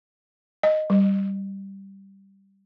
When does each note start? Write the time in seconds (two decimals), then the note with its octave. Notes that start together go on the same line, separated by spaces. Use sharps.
0.63 D#5
0.90 G3